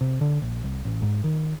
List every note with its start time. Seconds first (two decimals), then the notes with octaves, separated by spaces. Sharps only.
0.01 C3
0.21 D3
0.42 A#1
0.64 C2
0.85 A1
1.02 G#2
1.24 D#3